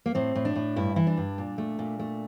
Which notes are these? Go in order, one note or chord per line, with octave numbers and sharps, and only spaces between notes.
A#3
A2 C4
A2
D4
A2
G2 E4
E3 E4
D4
G2
A#2
A3
A#2
A3